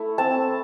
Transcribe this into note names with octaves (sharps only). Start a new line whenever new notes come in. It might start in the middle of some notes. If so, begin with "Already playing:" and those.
Already playing: A3 E4
C4 A5